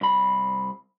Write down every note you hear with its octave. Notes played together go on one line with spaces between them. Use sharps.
C2 B5